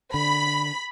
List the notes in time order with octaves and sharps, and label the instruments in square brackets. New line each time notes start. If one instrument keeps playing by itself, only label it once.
[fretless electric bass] D3 [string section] B5